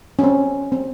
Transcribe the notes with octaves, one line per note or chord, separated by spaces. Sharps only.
C#4
C4
C4